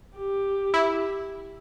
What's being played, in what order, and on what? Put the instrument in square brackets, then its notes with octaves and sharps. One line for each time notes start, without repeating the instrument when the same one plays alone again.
[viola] G4
[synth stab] E4